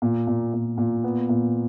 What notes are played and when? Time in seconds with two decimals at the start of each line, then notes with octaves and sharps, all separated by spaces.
0.02 A#2
0.27 A#2
0.53 A#2
0.78 A#2
1.04 B3
1.29 A#2